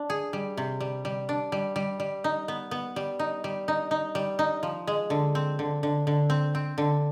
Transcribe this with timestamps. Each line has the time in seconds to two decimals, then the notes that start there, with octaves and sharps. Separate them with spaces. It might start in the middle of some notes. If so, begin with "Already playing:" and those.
Already playing: D4
0.10 G#4
0.33 G3
0.57 C3
0.80 G3
1.05 G3
1.29 D4
1.52 G3
1.76 G3
2.00 G3
2.24 D#4
2.48 B3
2.71 B3
2.96 G3
3.19 D#4
3.44 G3
3.68 D#4
3.91 D#4
4.15 G3
4.39 D#4
4.63 F3
4.87 G#3
5.10 D3
5.35 C4
5.59 D3
5.83 D3
6.07 D3
6.30 C4
6.55 C4
6.78 D3